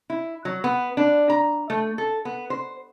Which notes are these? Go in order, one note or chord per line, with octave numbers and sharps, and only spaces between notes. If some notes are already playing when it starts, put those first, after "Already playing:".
E4
F#3
B3
D4
A#5
A3
A4
B3
C5